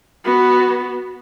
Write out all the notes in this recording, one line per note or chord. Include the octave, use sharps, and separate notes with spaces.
B3 F#4